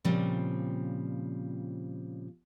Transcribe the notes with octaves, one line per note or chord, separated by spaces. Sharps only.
A#2 C#3 F3 G3 C4